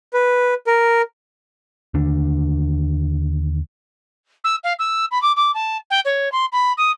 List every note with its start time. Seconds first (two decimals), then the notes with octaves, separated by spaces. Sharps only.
0.13 B4
0.67 A#4
1.94 D#2 D3 D4
4.44 E6
4.64 F5
4.79 E6
5.11 B5
5.22 D6
5.36 D6
5.54 A5
5.90 G5
6.05 C#5
6.32 C6
6.52 B5
6.77 D#6